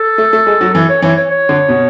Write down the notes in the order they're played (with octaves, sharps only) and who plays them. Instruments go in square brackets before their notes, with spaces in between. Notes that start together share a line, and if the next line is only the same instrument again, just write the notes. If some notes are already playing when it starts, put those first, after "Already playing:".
Already playing: [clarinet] A4
[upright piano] A3
A3
G#3
F#3
[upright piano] E3 [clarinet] A4
[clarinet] C#5
[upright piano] E3 [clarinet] C#5
[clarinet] C#5
C#5
[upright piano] D3
B2